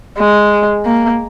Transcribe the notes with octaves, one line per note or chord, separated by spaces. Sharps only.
G#3
A#3